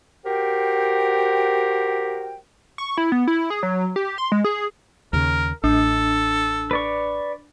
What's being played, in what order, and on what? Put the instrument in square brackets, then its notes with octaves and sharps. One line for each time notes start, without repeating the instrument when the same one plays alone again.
[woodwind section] F#4 G4 A#4 C5 G5
[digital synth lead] C#6
E4
B3
E4
G#4
F#3
G4
C6
G#3
G#4
[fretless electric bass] D#2 C#3 [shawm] A#4
[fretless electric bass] A1 [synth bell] D4 [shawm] A4
[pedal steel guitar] B4 D5 C#6